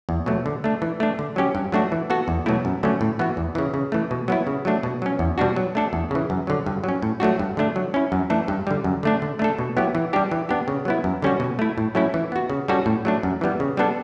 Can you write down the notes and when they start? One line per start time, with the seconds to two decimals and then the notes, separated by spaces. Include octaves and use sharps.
0.09 E2
0.26 B2 F#3 A3
0.46 D3
0.64 A3 D4
0.82 E3
1.00 A3 D4
1.19 D3
1.36 F#3 C#4 G4
1.55 G2
1.72 F#3 A3 D4 F#4
1.92 E3
2.10 B3 F#4 A4
2.28 E2
2.46 B2 F#3 A3 E4
2.65 F#2
2.83 D3 F#3 A3 C#4
3.01 A2
3.19 E3 B3 F#4
3.37 E2
3.55 C#3 E3
3.74 C#3
3.92 E3 A3
4.11 B2
4.28 F#3 B3 E4
4.47 C#3
4.65 F#3 A3 D4
4.83 B2
5.02 F#3 C#4
5.19 E2
5.38 B2 G3 D4 F#4
5.56 F#3
5.75 A3 D4 A4
5.93 E2
6.11 C#3 E3
6.30 F#2
6.47 D3 F#3
6.66 G2
6.84 F#3 C#4
7.02 A2
7.20 F#3 A3 D4 F#4
7.39 G2
7.57 D3 A3 D4
7.76 F#3
7.94 C#4 E4
8.12 F#2
8.30 E3 A3 D4 A4
8.48 G2
8.67 D3 G3
8.84 F#2
9.03 D3 A3 D4
9.22 D3
9.39 A3 D4 A4
9.58 B2
9.77 F#3 B3 E4 G4
9.95 E3
10.13 G3 D4 G4
10.31 E3
10.49 B3 D4 G4
10.68 C#3
10.85 F#3 B3 E4
11.04 F#2
11.22 D3 G3 C#4 F#4
11.40 B2
11.59 A3 E4
11.78 A2
11.95 F#3 A3 C#4 E4
12.14 E3
12.32 B3 F#4
12.50 C#3
12.68 G3 C#4 F#4 A4
12.86 A2
13.05 F#3 A3 D4
13.23 F#2
13.41 E3 G3 B3
13.60 C#3
13.77 G3 B3 D4 A4